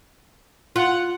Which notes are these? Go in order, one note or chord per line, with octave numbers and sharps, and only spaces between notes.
F4 F#5